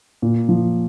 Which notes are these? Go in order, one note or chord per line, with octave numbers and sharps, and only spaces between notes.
A#2
F3